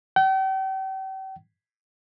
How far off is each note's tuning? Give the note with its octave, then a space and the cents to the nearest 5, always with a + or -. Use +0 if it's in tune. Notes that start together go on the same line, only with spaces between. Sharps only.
G5 -40